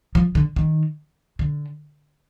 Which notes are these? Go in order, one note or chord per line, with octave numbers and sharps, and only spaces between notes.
F3
D3
D#3
D3